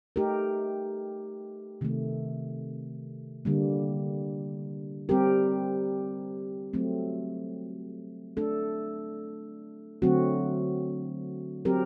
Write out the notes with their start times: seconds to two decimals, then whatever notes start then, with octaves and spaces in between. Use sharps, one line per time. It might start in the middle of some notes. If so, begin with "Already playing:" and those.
0.16 A3 D#4 G4 A#4
1.81 C3 D#3 A3
3.45 D3 G3 A#3
5.09 G3 C4 G4 A#4
6.73 F#3 A3 C4
8.37 A3 D4 A4
10.02 D3 F#3 A3 C4 F#4
11.65 F#3 C4 G4 A#4